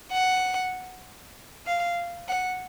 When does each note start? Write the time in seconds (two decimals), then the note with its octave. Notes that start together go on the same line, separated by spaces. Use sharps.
0.12 F#5
1.67 F5
2.28 F#5